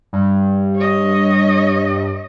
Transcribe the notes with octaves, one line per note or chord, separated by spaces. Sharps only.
G2
C#5 D#5